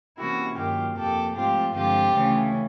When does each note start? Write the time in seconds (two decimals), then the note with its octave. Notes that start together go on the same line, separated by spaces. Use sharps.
0.18 C3 E3 G3 A#3 C#4 E4 F#4
0.57 G2 D#3 F#3 A#3 F4 G4
0.96 F2 C3 F3 A#3 G4 A4
1.35 G#2 F3 A3 C4 F4 G4
1.74 G2 D3 F3 G#3 C4 F4 G4
2.13 D2 C#3 E3 A3 C#4